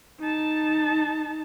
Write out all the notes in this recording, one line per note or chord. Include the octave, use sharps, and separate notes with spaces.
D#4 A5